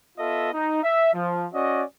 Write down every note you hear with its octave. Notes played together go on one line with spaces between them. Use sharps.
B3 F4 A4 D#5 E5
D#4
E5
F3
C#4 F#4 D5 D#5